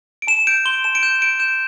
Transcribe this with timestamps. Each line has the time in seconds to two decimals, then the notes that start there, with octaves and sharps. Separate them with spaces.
0.22 D7
0.27 A5 E7
0.47 G6 D7
0.65 C6 G7
0.84 A5 E7
0.95 D7
1.03 G6 E7
1.21 G6 D7
1.40 G6 E7